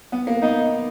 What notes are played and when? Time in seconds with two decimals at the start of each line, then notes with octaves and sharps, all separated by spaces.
0.12 B3
0.27 A#3
0.42 B3 D#4